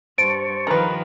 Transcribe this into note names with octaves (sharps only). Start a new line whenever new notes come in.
G2 C5 A5 C#6 D7
D#3 F3 A#4 B4